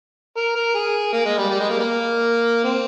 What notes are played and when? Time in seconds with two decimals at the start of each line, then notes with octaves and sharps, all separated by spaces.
0.37 A#4
0.56 A#4
0.75 G#4
1.13 A#3
1.26 G#3
1.39 G3
1.50 G3
1.60 G#3
1.69 A#3
1.80 A#3
2.64 C4